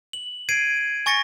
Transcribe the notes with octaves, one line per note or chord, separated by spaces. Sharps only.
F#7
G#6 C7 D7 D#7
G#5 C#6 A6 A#6 C#7